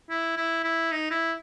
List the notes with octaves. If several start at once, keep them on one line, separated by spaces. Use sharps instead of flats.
E4
E4
E4
D#4
E4